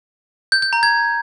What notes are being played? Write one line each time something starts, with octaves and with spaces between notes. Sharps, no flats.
G6
G6
A#5
G#6